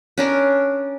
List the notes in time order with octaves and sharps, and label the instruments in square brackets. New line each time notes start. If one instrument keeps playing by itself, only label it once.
[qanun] C#4 D4 A#4